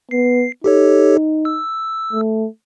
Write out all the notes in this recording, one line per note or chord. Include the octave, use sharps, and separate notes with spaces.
B3 C7
D#4 G4 A4 C#5
E6
A3